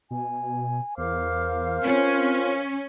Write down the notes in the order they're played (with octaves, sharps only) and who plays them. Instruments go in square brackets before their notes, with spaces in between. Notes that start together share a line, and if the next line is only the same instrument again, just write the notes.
[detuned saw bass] B2 [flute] G#5
[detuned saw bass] E2 [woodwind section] A#4 C5 F5 [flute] D6
[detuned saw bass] C4 [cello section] C#4 [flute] F4